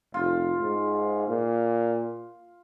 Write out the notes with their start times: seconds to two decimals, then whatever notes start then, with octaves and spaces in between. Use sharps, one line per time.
0.14 F1 F4
0.61 G#2
1.28 A#2